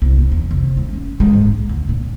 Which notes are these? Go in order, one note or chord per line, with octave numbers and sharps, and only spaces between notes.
C2
B3
E2
F1
A3
C#4
G#3
G#2
B1
D2
A#2